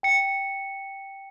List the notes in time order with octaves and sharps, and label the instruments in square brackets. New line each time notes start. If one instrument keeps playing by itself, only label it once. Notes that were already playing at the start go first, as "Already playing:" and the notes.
[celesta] G5 C#7